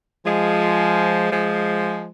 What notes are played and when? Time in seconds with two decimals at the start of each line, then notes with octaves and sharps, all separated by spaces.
0.25 F3 G#3
1.31 F3 G#3